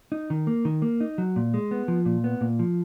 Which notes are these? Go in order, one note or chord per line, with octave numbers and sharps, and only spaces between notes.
D#4
D#3
A#3
D#3
A#3
D#4
F#3
A#2
G#3
B3
F3
A#2
B3
A#2
F3